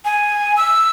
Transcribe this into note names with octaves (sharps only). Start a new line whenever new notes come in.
G#5
E6